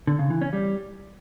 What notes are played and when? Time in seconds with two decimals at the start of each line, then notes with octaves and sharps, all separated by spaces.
0.07 D3
0.19 C#3
0.30 E3
0.41 C#4
0.53 G3